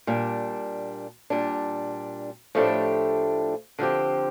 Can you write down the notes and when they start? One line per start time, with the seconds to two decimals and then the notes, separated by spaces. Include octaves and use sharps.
0.07 A#2 G3 D4
1.30 A#2 G3 D4
2.55 A2 F3 A3 D4 G4
3.79 D3 F3 C4 G4